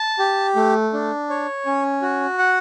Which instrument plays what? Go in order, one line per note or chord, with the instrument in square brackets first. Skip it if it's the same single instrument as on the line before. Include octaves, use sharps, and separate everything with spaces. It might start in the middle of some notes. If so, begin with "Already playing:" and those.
Already playing: [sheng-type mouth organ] A5
G4
A3
D4
C#5
C#4
F#4
F#5